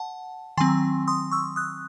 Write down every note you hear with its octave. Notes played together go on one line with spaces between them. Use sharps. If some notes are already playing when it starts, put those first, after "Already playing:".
Already playing: F#5 A5
D#3 F#3 C4 G#5 C6
C6 D#6
C#6 E6
D#6 F#6